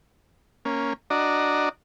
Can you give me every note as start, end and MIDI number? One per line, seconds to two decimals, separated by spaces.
0.65 0.93 58
0.65 0.93 61
1.10 1.69 62
1.10 1.69 66
1.10 1.69 74
1.10 1.69 75
1.10 1.69 82